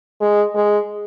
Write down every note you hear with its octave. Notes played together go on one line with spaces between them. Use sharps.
G#3
G#3